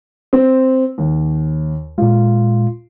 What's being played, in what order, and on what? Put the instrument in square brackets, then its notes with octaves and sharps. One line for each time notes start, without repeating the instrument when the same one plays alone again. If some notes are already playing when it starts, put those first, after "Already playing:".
[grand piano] C4
D#2
[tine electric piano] A#2 G#3 [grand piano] F4